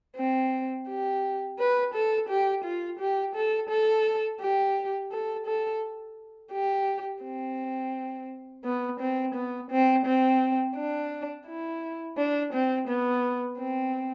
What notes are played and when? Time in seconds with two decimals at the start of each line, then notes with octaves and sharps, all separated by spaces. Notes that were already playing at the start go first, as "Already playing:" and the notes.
0.16 C4
0.88 G4
1.59 B4
1.94 A4
2.29 G4
2.65 F4
3.00 G4
3.35 A4
3.70 A4
4.41 G4
5.12 A4
5.47 A4
6.52 G4
7.23 C4
8.64 B3
9.00 C4
9.35 B3
9.71 C4
10.06 C4
10.76 D4
11.47 E4
12.18 D4
12.54 C4
12.88 B3
13.58 C4